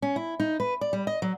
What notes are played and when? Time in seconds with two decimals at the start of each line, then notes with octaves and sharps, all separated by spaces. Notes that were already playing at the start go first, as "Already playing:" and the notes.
0.02 C#4
0.16 E4
0.40 D#4
0.60 B4
0.81 D5
0.93 G3
1.07 D#5
1.22 F#3